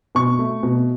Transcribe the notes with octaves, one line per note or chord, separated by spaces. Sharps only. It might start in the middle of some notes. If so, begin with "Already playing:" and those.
B2 C#6
A3
B2